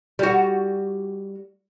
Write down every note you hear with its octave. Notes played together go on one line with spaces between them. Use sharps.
G3 F#4